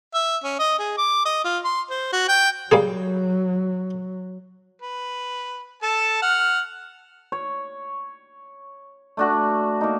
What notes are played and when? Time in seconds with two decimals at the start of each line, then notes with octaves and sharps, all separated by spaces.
0.14 E5
0.44 C#4
0.59 D#5
0.79 G#4
0.98 D6
1.25 D#5
1.44 F4
1.64 C6
1.90 C5
2.12 F#4
2.28 G5
2.71 F#3 G3 A#3 G#4
4.82 B4
5.83 A4 A5
6.22 F#5 F6
7.32 C#5
9.17 A3 D4 F#4
9.81 A#3 D#4